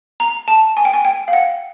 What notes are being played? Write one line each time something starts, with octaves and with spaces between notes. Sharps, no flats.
A#5
A5
G#5
G5
G#5
G5
F5
F#5